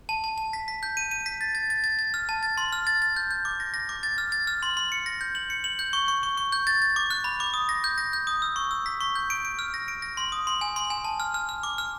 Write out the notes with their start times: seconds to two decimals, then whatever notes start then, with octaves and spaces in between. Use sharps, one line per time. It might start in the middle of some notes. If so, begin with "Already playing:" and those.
0.09 A5
0.24 A5
0.38 A5
0.53 B6
0.68 B6
0.83 G6
0.97 D#7
1.11 D#7
1.26 B6
1.41 A6
1.55 A6
1.70 A6
1.84 A6
1.99 A6
2.14 F6
2.29 A5
2.43 A6
2.58 C6
2.72 F6
2.87 A6
3.02 A6
3.16 G6
3.31 G6
3.45 D6
3.60 A#6
3.74 A#6
3.89 D6
4.03 A6
4.18 F6
4.32 A6
4.47 F6
4.63 C6
4.77 C6
4.92 C#7
5.06 A#6
5.21 G6
5.35 F#7
5.50 C#7
5.64 F#7
5.79 G6
5.93 C#6
6.08 C#6
6.23 C#6
6.37 C#6
6.52 G6
6.67 A6
6.82 A6
6.96 D6
7.11 F#6
7.24 B5
7.40 D6
7.54 D#6
7.69 A#6
7.84 G6
7.98 A#6
8.13 G6
8.27 D#6
8.42 E6
8.56 C#6
8.71 E6
8.86 B6
9.01 C#6
9.16 G6
9.30 D7
9.45 D7
9.59 F6
9.74 A#6
9.88 D7
10.02 A#6
10.17 C6
10.32 D#6
10.47 C6
10.61 G#5
10.76 C6
10.90 G#5
11.05 A5
11.20 F6
11.34 F6
11.49 F6
11.63 D6
11.78 F6